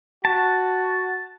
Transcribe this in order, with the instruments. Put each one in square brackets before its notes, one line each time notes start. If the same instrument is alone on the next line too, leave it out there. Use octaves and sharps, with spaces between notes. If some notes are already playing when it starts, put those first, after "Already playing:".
[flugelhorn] F#4 [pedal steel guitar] A5